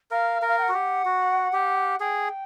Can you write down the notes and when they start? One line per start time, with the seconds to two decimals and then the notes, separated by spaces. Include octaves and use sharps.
0.11 A#4 F5
0.42 A#4
0.48 F5
0.58 G5
0.62 F#5
0.69 F#4
0.74 G4
1.05 F#4
1.53 G4
2.00 G#4 G5